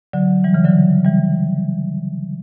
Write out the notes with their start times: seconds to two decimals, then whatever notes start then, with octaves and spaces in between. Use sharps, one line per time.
0.13 D3 F#3
0.44 E3 G3
0.54 C#3 E3
0.64 D3 F#3
1.05 E3 G3